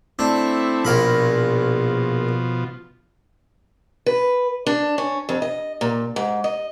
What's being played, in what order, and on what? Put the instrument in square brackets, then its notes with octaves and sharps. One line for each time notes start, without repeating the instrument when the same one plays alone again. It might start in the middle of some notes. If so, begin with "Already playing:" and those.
[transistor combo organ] A3 C4 E4 [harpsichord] D4
[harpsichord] A#1 A#4 B5 [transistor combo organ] B2 F3
[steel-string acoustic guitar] B4
D4
C#4
F2
D#5
A#2
G#2
D#5